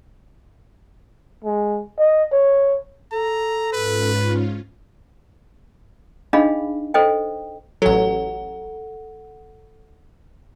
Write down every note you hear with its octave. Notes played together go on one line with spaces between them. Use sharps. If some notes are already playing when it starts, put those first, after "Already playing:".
G#3
D#5
C#5
A4 A#5
G#2 C#4 F4 B4
D4 D#4 G#4 D#5 F5 B5
A4 C5 D#5 G5
A1 F#3 A4 F#5